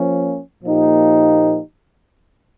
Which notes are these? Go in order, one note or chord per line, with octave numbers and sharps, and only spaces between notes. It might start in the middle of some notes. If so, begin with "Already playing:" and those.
Already playing: F3 A#3 C#4
A#2 F3 A#3 D#4 G4